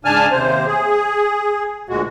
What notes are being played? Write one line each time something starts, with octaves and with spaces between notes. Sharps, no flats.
G#2 C#3 D4 G#5 A5 F6
D#2 C3 C5
G#4
D2 A#2 G#3 F#4